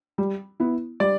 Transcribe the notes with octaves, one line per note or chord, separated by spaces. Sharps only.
G3
B3 E4
G3 D5